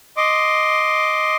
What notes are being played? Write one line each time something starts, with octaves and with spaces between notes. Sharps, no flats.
D#5 C6 D6